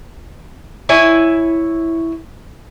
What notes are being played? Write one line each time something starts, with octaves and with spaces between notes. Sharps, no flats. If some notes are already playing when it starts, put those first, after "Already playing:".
E4 C#5 G#5